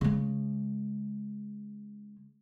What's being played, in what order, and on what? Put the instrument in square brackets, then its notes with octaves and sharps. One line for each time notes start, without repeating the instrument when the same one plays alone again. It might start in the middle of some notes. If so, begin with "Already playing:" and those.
[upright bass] C#3 G#3